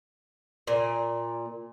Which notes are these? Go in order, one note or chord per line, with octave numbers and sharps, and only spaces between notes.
A#2